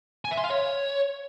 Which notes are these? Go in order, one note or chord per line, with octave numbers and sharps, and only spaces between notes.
G#5
E5
C6
F5
C#5